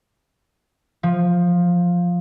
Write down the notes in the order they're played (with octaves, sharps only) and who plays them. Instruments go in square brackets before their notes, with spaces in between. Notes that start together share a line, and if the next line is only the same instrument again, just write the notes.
[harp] F3